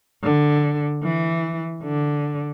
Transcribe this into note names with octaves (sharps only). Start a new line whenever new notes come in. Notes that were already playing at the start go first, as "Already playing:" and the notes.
D3
E3
D3